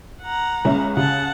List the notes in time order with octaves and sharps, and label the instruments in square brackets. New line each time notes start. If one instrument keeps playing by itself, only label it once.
[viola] F#5 A#5
[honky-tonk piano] C#2 C#4 E5
[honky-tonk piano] C#3 [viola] F#5 A5